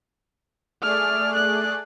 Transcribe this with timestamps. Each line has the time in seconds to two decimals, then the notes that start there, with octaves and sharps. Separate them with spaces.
0.82 A3 G#4 D5 F6
1.35 F#6